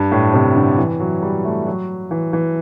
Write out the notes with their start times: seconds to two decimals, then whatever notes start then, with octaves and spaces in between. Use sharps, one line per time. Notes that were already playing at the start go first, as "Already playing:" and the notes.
Already playing: G2
0.12 A2
0.34 C3
0.56 D3
0.78 E3
1.00 F#3
1.22 G3
1.45 A3
1.67 F#3
2.11 E3
2.33 E3